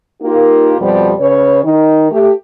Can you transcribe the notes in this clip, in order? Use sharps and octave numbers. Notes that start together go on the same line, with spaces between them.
A#3 D#4 F4 G4 A#4
F2 B2 F3 G3
C#3 B4 C#5
D#3 D#4
A3 G4